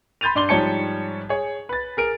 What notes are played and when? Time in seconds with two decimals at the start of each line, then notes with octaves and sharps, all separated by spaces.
0.21 B5 C6 G6 A6 D#7 F7
0.35 G2 D5 C6 G7
0.49 G#2 F3 G3 C#5 A5 C#7
1.29 G#4 C#5
1.69 B4 A6
1.97 G#4 A#4 D7